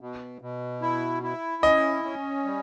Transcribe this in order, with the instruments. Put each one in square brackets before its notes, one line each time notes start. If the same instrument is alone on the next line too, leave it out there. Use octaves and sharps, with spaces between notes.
[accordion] B2
B2
E4
E4
[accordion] C#4 [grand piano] D#5
[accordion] C#4
G3